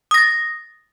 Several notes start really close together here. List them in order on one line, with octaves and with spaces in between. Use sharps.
D#6 A#6 A6